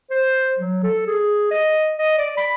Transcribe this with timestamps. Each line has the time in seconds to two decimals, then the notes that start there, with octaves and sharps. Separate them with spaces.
0.10 C5
0.59 F#3
0.83 A4
1.07 G#4
1.51 D#5
1.98 D#5
2.18 D5
2.37 B5